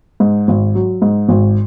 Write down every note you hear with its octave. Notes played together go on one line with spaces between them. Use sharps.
G#2
G#1
F#3
G#2
G#1